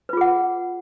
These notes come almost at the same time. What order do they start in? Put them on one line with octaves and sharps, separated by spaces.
B4 F4 G#4 F#5